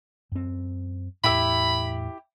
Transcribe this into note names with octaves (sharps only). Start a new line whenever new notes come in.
F#2 C4
E2 A2 E4 G4 E5 B5